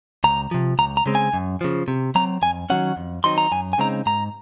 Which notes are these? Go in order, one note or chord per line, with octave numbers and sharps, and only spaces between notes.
C#2 A#5
C3 F3
C#2 A#5
A#5
C#3 G#3 C4
G#5
F#2
C#3 F3
C3
F#3 C4 A#5
F2 G#5
D#3 F#3 C#4 F#5
F2
D#3 F#3 C4 D#4 C6
A#5
F#2 G#5
G#5
C#3 G#3 C4 D#4 A#5
G#2 A#5